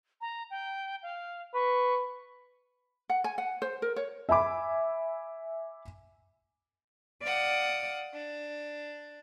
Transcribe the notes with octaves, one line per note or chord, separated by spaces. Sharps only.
A#5
G5
F5
B4 C#6
F#5
G#5
F#5
C5
A#4
C#5
E5 G#5 B5 D6
D5 F5 F#5 D#6
D4